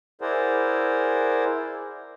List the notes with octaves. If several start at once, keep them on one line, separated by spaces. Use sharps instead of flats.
E4 G#4 A#4 C5 D5 F#5